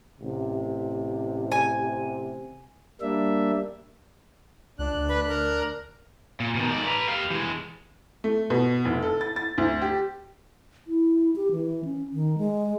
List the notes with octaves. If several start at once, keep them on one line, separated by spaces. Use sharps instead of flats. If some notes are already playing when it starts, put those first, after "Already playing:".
A1 C3
G#5
G3 A#3 D4 E5
C#2 D4 F#6
D2
B4
A#4
A#2
B2 D#3
G#2 D5
B4 A#5
G4 F5
E3 G#3
A3
B2
F1
A4
A6
A6
D2
G4
E4
G4
E3
C#4
D#3
G#3